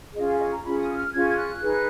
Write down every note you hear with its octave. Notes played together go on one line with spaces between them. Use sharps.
C#4 F4 G#4 D#5
F5
D#5
A#5
C#4 F4 G#4 B5
D#6
D#6
F6
C#4 F4 G#4 G#6
G#6
F#6
D#4 G#4 B4